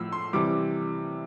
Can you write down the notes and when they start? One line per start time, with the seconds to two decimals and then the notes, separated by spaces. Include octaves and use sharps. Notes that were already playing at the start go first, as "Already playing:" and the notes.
Already playing: A2 F3 E6
0.12 C6
0.33 C3 E3 G3 D6